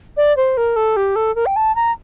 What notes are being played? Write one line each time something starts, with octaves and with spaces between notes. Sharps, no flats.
D5
C5
A#4
A4
G4
A4
A#4
G5
A5
A#5